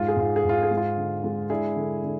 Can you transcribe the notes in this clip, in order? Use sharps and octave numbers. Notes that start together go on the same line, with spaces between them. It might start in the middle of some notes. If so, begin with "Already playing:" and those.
Already playing: G#2 G#3 F4
G#4
G#2 F4
G#4
G#2
F4
G#4
G#3
F4
D3
G#3
D4 E4 G#4
D3
D3